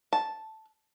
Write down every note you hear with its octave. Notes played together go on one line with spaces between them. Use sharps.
A5